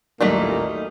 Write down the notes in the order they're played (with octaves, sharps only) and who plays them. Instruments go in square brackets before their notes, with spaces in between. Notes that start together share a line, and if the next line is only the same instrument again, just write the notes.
[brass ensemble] A1 D#2 A#2 [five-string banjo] F#3 G3 A3 [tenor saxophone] A#3 [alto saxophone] D#4